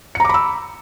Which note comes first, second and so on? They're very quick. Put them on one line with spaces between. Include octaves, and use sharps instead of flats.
C#7 A#5 D6 B5 E6